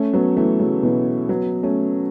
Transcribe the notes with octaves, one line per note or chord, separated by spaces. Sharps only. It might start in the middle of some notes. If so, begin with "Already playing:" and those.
Already playing: A3 C#4
F#3 B3
E3 A3
C#3 F#3
B2 E3
F#3 B3
A3 C#4